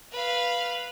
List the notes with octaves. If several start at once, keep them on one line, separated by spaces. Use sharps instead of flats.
B4 F5